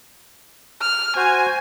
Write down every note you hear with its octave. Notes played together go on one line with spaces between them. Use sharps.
F6
F#4 C5 G#5